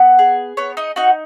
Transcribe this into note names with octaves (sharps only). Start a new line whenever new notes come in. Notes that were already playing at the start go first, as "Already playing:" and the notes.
Already playing: B3 F#5
G#4
B3 C#5
D#4 D#5
D#4 F#4 F#5